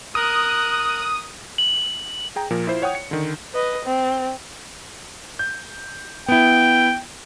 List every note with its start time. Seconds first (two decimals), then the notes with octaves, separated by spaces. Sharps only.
0.15 A#4 D#6 F#6
1.58 F#7
2.36 G#4 G5 A#5
2.50 A#2 F3 A#4
2.67 E4 F4 C5
2.82 C#5 F#5 G5 D#6
2.95 C#7
3.11 D3 D#3
3.53 B4 D#5
3.85 C4
5.39 G6
6.28 B3 E4 G5